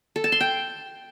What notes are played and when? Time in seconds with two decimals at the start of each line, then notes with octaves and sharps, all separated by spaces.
0.16 A4
0.24 A5
0.32 C6
0.40 G5